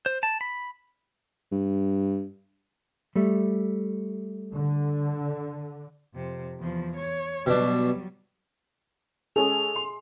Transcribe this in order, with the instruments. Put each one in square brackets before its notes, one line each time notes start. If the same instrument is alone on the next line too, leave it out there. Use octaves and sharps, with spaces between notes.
[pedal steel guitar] C5
A5
B5
[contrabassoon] G2
[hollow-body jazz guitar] G3 A3
[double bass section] D3
[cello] F2 C3
E2 F3
C#5
[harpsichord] B2 D4 [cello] F#3 G3
[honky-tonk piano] G#3 C#4 A4 [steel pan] G#4 [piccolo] F7
[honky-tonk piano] C6